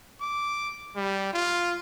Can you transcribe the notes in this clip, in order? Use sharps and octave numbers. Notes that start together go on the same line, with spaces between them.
D6
G3
F4